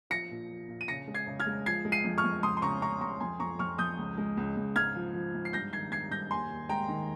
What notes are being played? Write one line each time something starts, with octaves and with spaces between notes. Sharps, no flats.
F3 A#6 C#7
A#2
F3
A#2
D#7
C#3 A#6 C#7
G#3
G#6 C7
C#3
F6 G#6
G#3
F3 G#6 C7
G#3
C7 D#7
F2
C#6 F6
F2
C#2 C6 D#6
C6
C#3 A#5 C#6
C#3 A#5 C#6
C#2 A#5 C#6
F2 G#5 C6
F2 A#5 C#6
F2 C#6 F6
F2 D#6 G6
C#2
G#3
C#2
C#2
G#2 F6 G#6
F3
F3
G#2
C7
G2 G6 A#6
D#3 G#6 C7
G2 G#6 C7
G2 G6 A#6
D#2 G#5 C6
D#2
G#3 G5 A#5
D#3